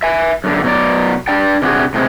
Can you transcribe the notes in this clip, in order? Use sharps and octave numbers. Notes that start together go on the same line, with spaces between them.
E5 G#5
F#2 D3
B2 F#3 D5
D4 D5 G5
C3 D4 F#4 G#4
A2 C3 G#3 A#3 C4